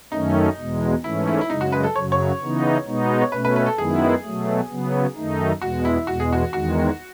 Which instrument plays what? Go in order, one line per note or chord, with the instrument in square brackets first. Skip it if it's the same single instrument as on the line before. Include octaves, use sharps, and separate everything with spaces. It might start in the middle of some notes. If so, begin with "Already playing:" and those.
[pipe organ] F#2 D#3 A3 C#4 [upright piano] D#4
[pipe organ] E2 B2 G#3
[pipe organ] G#2 E3 A3 C#4 [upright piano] E4
[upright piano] E4
E4
[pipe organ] F#2 C#3 G#3 [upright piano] D#4
[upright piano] F#4
B4
A4
[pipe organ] F#2 C#3 F#3 [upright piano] C#5
[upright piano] C#5
[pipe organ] C#3 E3 B3 D#4
B2 G#3 B3 D#4
[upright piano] C#5
[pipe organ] B2 A3 C#4 [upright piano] B4
[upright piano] B4
B4
A4
[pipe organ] F#2 D#3 G#3 B3 E4 [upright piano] G#4
[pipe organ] B2 F#3 A3
C#3 F#3 B3
F#2 D#3 A3 D#4
[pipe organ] E2 B2 G#3 [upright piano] F#4
[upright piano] E4
[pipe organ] E2 B2 G#3 [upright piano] F#4
[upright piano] G#4
F#4
[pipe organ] E2 D#3 G#3 [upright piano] F#4